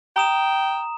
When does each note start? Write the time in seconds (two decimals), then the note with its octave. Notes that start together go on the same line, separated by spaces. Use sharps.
0.16 G5 A#5 D#6 E7